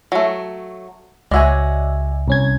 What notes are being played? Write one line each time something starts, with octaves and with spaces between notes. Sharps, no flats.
F#3 A3
C#2 G#3 F#4 C#5 D5 E5 G#5
C2 C#4 G#6